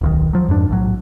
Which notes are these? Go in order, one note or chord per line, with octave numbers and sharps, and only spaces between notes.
D1 B1 D#3
F3 F#3
F2 G#2 D4
B1 A2 F#3